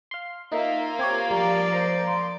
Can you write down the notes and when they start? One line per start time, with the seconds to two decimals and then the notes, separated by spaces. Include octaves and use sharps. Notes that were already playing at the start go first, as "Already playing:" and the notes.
0.11 F5 C6
0.52 A#3 D#4 F4 E5 F5
0.99 C4 G4 C#5 G#6
1.31 F3 G3 D5 A#5
1.73 C5 A#5
2.06 C6